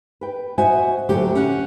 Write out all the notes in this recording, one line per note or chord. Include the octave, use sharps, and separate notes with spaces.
B4 G5
F#4 C5 C#5 D#5 E5 G#5
D2 A#2 D3 F#3 G4
C#4 F#5